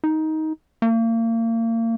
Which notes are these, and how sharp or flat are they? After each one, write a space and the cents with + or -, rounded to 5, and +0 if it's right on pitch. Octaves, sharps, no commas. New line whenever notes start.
D#4 +15
A#3 -35